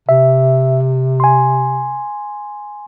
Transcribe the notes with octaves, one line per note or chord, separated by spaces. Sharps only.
C3 E5
G#5 C6